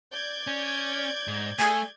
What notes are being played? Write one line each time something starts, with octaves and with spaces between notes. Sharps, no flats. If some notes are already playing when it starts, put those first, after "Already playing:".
D5 G6 G#6
C#4
G#2
A3 G#5